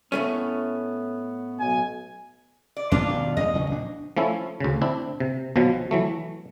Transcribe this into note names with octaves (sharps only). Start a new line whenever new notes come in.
A2 A3 B3 C#4
B1 G#5
D5
E2 B3 D4 F4
G2 B2 D#3
E2 G#3 D#5
E2 C#3 C#4
A#1 D4
F3 A3 C#4 E4
D2 C#3
C4 D4 E4
C3
B1 B2 F3 F#3
E3 F#3 A3